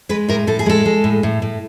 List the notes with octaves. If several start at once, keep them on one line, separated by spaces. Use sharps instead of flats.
G#3 B4
A2 A#4
A2 A4
G#4
G#3 A4
G#3
A2
A2
A2